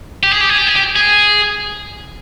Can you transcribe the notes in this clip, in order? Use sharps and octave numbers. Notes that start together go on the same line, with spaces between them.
G4
G#4
G4
G#4
G4
G#4
G4
G#4